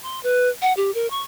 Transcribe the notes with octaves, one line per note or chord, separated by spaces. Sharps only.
C6
B4
F#5
G4
A#4
C#6